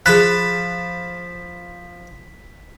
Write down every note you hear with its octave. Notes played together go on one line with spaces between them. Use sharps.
F3 G#4 A5 B5 F#6 B6